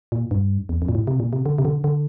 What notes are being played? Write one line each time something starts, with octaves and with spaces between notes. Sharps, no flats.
A#2
G2
E2
F2
A#2
A2
C3
A#2
C3
D3
C3
D3
D3